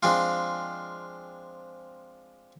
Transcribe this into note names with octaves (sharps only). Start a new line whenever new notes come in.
F3 G#3 C4 D4 F4